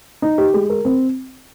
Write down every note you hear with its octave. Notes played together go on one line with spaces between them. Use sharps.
D#4
G4
G#3
A#4
C4